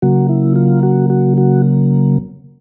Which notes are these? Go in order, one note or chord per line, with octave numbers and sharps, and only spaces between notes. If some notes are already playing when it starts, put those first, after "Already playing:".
C#3 F#3 A#3 F#4
E4
F4
F#4
F#4
F#4